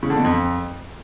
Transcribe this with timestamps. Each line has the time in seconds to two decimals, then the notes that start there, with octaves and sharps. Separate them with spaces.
0.03 C#3
0.10 D3
0.17 B2
0.24 F2